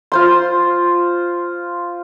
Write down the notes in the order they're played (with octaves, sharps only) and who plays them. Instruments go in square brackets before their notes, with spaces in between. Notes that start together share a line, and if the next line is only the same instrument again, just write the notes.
[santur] F4 C5 C6